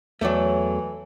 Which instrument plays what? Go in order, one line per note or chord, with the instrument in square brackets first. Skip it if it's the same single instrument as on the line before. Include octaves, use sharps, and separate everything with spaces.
[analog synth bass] E2 [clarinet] E3 [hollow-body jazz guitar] F#3 A3 [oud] A4 C#5 D5